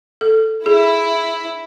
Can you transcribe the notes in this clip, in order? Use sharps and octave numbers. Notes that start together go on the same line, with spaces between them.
A4
E4 G#4